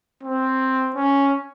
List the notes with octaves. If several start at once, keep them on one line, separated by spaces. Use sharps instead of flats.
C4
C#4